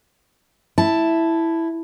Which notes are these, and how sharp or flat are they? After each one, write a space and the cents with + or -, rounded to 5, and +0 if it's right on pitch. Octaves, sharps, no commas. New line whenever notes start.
E4 +0 A5 +0